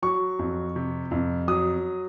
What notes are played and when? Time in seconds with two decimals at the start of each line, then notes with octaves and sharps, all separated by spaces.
0.03 F#3 C#6
0.39 F2
0.76 C3
1.11 F2
1.48 F#3 D#6